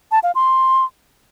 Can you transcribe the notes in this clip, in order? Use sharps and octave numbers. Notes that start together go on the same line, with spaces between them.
A5
F5
C6